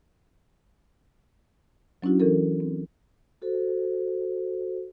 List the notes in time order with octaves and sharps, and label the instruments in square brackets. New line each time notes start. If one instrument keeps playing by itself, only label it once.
[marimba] F#3 C#4 D4 E4 F#4
E3 C#4 A4 A#4
C4
[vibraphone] F#4 A4 C5